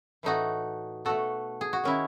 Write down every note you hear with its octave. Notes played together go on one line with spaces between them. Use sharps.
A2 E3 A3 D#4 F#4
B2 A3 F#4 A4
G#4
F#4
D#3 G#3 C#4 E4